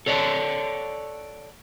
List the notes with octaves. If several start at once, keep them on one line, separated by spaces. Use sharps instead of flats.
A4 C#5 D5 F5 F#5 A5